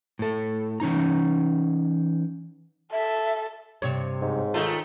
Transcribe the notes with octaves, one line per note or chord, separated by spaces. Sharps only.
A2 A4
E3 C#4 D#4 A#5
A4 E5
G2 C3 C#5
G#2
D#3 A3 F4